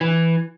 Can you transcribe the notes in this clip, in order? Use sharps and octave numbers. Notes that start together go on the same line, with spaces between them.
E3